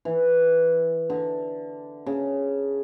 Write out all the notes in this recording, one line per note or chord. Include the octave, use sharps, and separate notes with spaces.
E3
D3
C#3